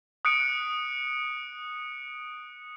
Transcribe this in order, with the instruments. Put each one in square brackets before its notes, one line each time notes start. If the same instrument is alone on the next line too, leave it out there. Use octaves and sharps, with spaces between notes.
[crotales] D#6 F#6 C#7 D7